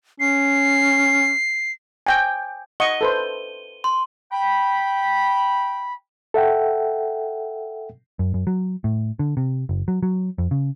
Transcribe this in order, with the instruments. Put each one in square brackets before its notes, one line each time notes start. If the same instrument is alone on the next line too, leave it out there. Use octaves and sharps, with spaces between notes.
[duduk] C#4 [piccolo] C7
[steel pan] G5 G#5
[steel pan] D#5 F#5 C#6 [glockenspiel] D#7 G7
[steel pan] A4 B4 C5
[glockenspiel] C6
[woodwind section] G5 B5
[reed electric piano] A4 E5 F#5 G5
[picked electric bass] F#2
F#2
F#3
A2
D3
C3
F#1
F#3
F#3
F2
C#3